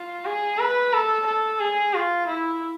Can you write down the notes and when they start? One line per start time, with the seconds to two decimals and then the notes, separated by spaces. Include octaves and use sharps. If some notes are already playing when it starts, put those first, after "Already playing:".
Already playing: F4
0.26 G#4
0.59 B4
0.93 A4
1.26 A4
1.60 G#4
1.94 F4
2.27 E4